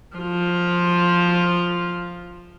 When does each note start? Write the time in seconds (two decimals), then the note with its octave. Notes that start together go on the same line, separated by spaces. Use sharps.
0.17 F3 F4